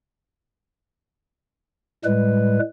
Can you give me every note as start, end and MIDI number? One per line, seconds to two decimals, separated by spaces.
2.05 2.59 45
2.05 2.59 55
2.05 2.59 56
2.05 2.59 71